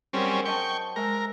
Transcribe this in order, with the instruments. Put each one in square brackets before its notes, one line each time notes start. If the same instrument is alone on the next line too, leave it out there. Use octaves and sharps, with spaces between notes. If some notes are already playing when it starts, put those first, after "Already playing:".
[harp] F#3 G#4 A#4 [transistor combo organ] G3 C4 C#4
[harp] C5 D#5 A5 [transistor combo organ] G5 C#6
[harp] G#3 E5 [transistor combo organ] A#4